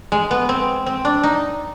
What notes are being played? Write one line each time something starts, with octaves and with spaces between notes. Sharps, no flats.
G#3
B3
C4
C4
D4
D#4